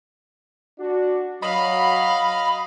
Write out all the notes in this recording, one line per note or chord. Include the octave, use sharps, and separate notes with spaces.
D4 F#4
F#3 D#5 F5 B5